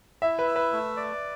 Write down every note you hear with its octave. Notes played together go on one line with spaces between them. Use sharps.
E4 E5
B4
E5
B4
A3
D5